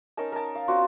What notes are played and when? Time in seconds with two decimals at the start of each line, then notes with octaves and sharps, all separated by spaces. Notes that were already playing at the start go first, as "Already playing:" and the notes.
0.17 C#4 D#4 A#4 A5
0.32 A#4 A5
0.55 F5
0.68 C4 D4 F4 F#4